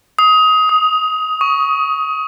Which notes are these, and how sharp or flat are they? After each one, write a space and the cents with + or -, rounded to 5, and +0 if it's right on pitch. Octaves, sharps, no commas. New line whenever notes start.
D#6 +20
D#6 +5
C#6 +10